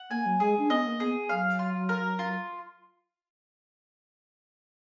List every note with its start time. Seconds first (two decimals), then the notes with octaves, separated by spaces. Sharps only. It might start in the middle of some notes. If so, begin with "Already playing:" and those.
Already playing: F#5
0.11 A#3 G#5
0.26 F#3
0.40 G#3 G#4
0.59 D4
0.70 B3 D#5
0.86 A#3
1.00 B3 G#4
1.29 F#3 F5
1.59 F4
1.89 A#4
2.19 F4